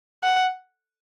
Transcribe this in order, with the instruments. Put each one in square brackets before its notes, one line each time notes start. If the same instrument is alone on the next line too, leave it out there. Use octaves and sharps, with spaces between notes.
[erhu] F#5